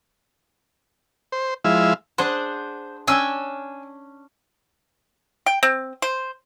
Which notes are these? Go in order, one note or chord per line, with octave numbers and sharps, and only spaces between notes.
C5
F3 G#3 E4 E5 F5
D4 G#4 C5 F#5
C#4 D4 G5 G#5 E6
G5
C4
C5